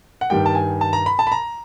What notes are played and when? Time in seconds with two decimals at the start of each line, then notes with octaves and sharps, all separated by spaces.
0.21 F#5
0.30 G2 D#3 G3 G5
0.46 A5
0.55 G#5
0.81 A5
0.93 A#5
1.06 B5
1.19 A5
1.27 B5
1.32 A#5